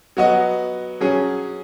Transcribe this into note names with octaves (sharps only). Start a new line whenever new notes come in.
F#3 B3 F#4 D#5
F#3 C#4 G#4